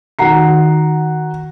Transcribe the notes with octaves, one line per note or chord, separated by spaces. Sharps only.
D#3 F#4 F#5 A#5 C7